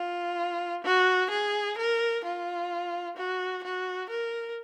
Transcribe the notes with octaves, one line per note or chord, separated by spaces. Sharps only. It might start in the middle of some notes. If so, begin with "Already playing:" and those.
Already playing: F4
F#4
G#4
A#4
F4
F#4
F#4
A#4